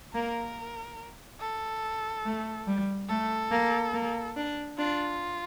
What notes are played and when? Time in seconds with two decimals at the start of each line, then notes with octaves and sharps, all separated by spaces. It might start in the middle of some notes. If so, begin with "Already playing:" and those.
0.14 A#3 A#4
1.41 A4
2.25 A3
2.67 G3
3.09 A3 A4
3.51 A#3
3.93 A#3
4.36 D4
4.78 D4 F4